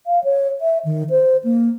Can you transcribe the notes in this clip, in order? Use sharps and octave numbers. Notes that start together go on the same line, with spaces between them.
F5
C#5
E5
D#3
C5
A#3